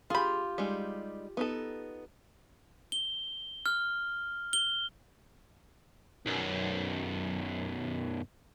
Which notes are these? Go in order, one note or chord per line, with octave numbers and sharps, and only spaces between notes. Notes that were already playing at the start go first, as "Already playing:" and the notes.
F4 G4 G#4 B5
G3 G#3 D#4
B3 D#4 A4
G7
F6
G7
B1 F#2